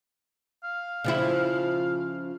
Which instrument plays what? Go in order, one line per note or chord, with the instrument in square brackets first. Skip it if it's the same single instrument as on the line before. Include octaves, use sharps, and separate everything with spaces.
[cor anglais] F5
[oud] C#3 F3 E4